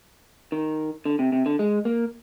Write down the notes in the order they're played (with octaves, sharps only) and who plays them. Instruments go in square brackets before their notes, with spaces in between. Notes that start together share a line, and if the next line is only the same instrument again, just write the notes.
[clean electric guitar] D#3
D3
C3
C3
D3
G#3
A#3